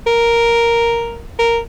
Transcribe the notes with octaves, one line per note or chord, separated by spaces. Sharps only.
A#4
A#4